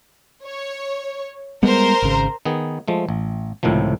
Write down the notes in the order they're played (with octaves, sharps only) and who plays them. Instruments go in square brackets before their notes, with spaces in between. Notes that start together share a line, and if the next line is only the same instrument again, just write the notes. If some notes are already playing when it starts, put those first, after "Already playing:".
[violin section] C#5
[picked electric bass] G3 G#3 B3 [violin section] A#4 C5
[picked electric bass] G#1 C#3
[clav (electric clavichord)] D#3 B3 G#4
F3 G#3 A3
A1
C#2 A2 C3 D#3 F3